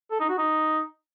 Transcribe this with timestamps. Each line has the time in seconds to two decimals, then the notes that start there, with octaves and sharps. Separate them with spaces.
0.11 A4
0.20 D#4
0.29 F#4
0.38 D#4